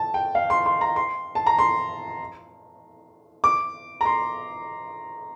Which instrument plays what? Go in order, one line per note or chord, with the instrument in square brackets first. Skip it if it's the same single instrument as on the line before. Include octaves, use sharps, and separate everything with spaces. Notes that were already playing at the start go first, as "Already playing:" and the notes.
Already playing: [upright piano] A5
G5
F5
C6
C6
A#5
C6
A5
A#5
C6
D6
A#5
C6